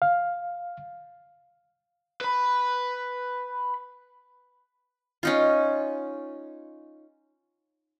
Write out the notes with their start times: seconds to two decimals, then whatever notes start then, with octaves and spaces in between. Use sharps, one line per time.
0.02 F5
2.21 B4 B5
5.23 C#4 D#4 F4